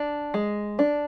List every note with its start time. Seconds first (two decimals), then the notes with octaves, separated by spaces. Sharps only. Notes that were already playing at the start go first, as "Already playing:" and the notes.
Already playing: D4
0.34 G#3
0.79 D4